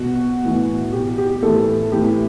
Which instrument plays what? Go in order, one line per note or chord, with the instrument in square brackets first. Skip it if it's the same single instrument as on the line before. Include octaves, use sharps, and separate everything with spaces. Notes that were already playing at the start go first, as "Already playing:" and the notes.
Already playing: [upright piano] B2 F#4
A2 E3
B2 G4
G4
A2 E3 A4
A2 E3 G4